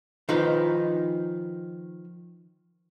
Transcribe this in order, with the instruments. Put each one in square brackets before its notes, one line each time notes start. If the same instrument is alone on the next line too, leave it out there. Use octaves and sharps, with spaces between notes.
[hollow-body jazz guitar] D#3 F3 D#4 B4